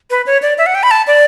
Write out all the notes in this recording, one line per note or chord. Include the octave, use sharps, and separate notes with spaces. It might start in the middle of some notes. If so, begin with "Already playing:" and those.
B4
C#5
D5
E5
F#5
G5
B5
A5
D5